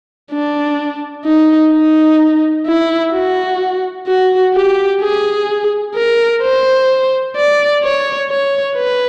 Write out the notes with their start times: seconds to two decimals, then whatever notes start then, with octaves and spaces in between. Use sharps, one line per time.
0.32 D4
1.25 D#4
1.73 D#4
2.66 E4
3.13 F#4
4.07 F#4
4.54 G4
5.01 G#4
5.95 A#4
6.42 C5
7.36 D5
7.83 C#5
8.30 C#5
8.77 B4